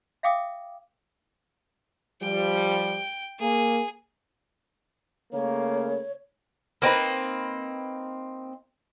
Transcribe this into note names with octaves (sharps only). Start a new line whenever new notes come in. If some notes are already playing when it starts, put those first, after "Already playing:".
E5 F5 G5 D6 D#6
F3 G3 G5
A#3 G#4
C#3 A3 A#3 C#5
A#3 C4 D#4 B4